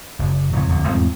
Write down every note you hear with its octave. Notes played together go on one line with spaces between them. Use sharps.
F#1
A1 F2 C#3 F#3
D1 F2 D3
E2 G#2 A3 C4